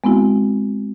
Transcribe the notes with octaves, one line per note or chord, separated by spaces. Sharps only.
G#3 B3 C4 E4 F#4